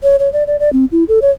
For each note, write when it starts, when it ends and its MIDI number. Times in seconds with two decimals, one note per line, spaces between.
0.03 0.16 73
0.19 0.31 73
0.33 0.44 74
0.47 0.56 74
0.60 0.72 74
0.73 0.85 60
0.92 1.04 64
1.08 1.19 69
1.22 1.31 73